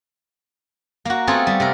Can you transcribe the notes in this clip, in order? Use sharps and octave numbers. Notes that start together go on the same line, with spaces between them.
A#3 F#4
A3 B3 C4 F4 G#4 A4
G3
C3 A#4